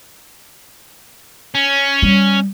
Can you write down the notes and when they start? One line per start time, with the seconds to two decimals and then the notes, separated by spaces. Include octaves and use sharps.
1.55 C#4
2.02 G3